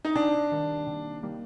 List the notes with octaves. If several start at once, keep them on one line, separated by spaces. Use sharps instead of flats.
D#4
C3 D4
D#3 G3 A#3
C3
D#3 G3 A#3